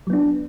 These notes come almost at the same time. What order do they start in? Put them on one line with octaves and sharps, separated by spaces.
F#3 B3 D4